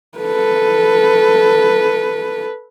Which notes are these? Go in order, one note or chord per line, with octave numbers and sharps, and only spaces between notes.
A4 B4